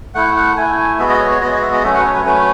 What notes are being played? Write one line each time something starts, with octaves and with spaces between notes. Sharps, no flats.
A3 E4 F#5
F#5
A3 E4 G#5
G#5
G#3 B3 F#4 E5
D#5
C#5
C#5
G#3 B3 F#4 D#5
D#5
E5
D#5
F#3 A3 C#4 E5
F#5
B4
C#5
B4
F#3 A3 C#4 B4